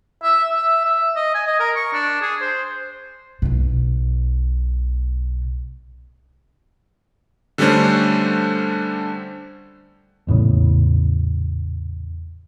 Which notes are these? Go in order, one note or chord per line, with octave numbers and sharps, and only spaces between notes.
E5
E5
E5
D#5
G#5
D#5
A#4
C#6
D4
G#4
C5
B1 B2
D3 G3 A3 C#4 D4 C5
A#1 E2 A2 C#3